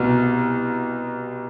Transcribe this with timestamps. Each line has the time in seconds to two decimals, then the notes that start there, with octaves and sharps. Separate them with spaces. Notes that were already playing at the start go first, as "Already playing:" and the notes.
Already playing: C2 B2